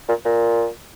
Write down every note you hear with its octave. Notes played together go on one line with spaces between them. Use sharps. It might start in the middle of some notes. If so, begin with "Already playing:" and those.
A#2
A#2